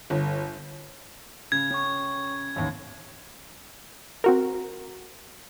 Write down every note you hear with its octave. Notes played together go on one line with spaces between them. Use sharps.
G1
C#3 G#6
C#4 C#6
A1 D#2
C4 F#4 A#4